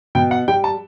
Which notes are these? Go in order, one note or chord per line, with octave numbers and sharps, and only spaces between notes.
B2 G5
F#5
G3 G5
A5